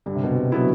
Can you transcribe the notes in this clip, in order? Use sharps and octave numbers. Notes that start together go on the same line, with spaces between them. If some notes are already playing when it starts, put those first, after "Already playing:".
G2 D3
C3
B2
C3
D3 F#3 B3 E4